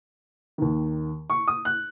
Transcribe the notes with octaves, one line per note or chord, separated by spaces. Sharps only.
D#2 D#3
C#6
D#6
F#6